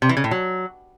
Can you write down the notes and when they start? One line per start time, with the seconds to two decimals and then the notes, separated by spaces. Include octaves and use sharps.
0.02 C3
0.09 E3
0.17 C#3
0.24 A2
0.31 F#3